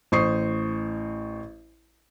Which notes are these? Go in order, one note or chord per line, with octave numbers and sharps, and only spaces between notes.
A1 C5 C#6 D#6 C7